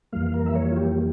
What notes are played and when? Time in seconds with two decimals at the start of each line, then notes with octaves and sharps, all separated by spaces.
0.12 F2 E3 G3 A#3 F5
0.34 A#4
0.46 E5
0.55 C#5
0.71 F4
0.76 G4